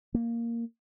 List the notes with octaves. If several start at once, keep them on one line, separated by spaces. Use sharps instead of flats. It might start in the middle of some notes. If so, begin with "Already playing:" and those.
A#3